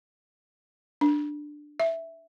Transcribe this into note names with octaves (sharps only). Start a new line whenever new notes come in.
D4
E5